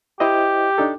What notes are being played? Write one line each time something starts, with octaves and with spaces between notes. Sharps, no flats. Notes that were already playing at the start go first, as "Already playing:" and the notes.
E4 G4 C5 D#5
D4 D#4 A4